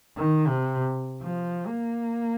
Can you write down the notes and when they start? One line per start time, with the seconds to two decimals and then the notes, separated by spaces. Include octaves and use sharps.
0.17 D#3
0.47 C3
1.22 F3
1.67 A#3